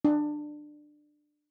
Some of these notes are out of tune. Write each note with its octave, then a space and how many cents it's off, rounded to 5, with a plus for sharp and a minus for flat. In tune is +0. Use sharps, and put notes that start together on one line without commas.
D4 +20